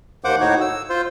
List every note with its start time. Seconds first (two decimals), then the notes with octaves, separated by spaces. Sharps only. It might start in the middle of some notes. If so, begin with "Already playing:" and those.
0.24 D#2 A#3 C5 F#5 D6
0.40 A2 D#4 F#4 C#5
0.61 E6
0.89 F4 C5